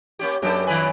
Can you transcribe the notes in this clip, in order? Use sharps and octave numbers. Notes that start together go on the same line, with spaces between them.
A#3 C#4 G4
F#2 A#3 D4 G4 A4
D#3 G3 B4 G#5